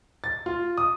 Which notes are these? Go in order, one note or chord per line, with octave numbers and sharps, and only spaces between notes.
A6
F4
D#6